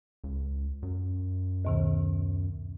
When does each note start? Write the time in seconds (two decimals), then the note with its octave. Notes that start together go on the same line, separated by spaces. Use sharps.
0.24 C#2
0.83 F#2
1.65 D2 B2 D#3